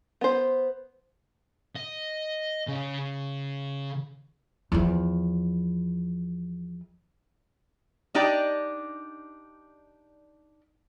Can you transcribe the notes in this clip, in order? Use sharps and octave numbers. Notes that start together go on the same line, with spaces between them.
B3 C5
D#5
C#3
E2 F3
D4 D#4 G4 D5